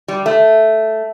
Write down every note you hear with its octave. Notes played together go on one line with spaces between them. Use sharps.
G3
A3